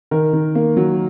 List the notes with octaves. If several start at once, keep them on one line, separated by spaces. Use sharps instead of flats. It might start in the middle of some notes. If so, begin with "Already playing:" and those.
D#3 A#4
D#3
A#3
F#3